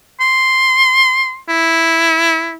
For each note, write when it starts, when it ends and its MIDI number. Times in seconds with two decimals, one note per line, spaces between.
0.21 1.39 84
1.49 2.57 64